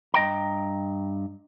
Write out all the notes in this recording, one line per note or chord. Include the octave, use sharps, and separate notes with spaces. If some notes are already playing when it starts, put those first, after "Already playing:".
G2 D#5 G5 A#5